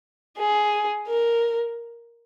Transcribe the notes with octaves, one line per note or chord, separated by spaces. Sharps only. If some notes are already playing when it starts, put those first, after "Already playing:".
G#4
A#4